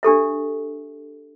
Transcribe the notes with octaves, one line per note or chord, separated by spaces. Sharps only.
D4 G4 A4 E5